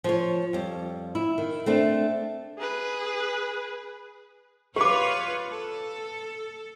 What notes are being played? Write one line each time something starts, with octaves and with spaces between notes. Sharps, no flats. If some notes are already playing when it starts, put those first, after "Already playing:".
F3 C#5
F2 G3
E4
D#3
A3 C4 D4
G#4 B4
F4 G4 B4 C#5 D6
A4